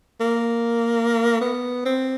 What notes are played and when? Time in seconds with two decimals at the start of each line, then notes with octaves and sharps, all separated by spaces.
0.21 A#3
1.41 B3
1.85 C4